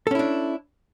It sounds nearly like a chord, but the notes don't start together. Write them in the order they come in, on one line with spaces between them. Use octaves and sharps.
A4 C#4 E4 D4